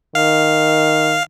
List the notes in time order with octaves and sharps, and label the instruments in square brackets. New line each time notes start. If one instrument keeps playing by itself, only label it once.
[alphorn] D#3 [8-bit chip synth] F5